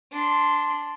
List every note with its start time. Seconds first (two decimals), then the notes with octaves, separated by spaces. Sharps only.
0.12 D4 C6